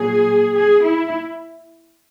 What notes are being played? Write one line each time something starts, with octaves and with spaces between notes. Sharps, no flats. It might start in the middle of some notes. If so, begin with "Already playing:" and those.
Already playing: A#2 F#3 G#4
G#4
E4